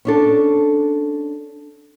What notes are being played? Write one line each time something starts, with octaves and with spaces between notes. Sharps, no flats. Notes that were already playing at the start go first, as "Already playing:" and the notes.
C#4 D4 A4